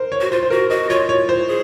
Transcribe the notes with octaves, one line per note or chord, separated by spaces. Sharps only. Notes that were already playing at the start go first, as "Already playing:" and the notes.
Already playing: A#4 C5
C#5
F#4
F4 C5
C5
F#4 A#4
F#4 D#5
F4 C#5
C#5
C5
G#4